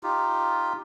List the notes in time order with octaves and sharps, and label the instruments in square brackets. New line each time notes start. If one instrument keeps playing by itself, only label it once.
[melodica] D#4 F4 G4